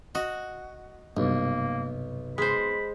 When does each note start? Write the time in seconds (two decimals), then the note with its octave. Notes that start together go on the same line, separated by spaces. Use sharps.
0.15 F#4 D#5
1.17 B1 G2 C3 A#3
2.38 G#3 C5 B5